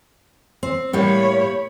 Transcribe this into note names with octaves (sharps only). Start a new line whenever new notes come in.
C4
A2 G3 A#3 C#5 B5